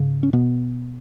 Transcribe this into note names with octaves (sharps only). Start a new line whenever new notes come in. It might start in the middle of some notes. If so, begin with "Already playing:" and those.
Already playing: G#2 C#3
C#4
B2 B3